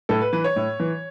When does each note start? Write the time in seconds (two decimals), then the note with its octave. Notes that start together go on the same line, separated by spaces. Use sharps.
0.09 A2 A4
0.21 B4
0.33 E3 B4
0.44 C#5
0.56 A2
0.80 E3